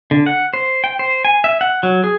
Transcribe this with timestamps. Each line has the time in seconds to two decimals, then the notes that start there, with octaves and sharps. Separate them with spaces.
0.11 D3
0.26 F#5
0.54 C5
0.84 G5
0.99 C5
1.25 G#5
1.44 E5
1.61 F#5
1.83 F#3
2.04 G#4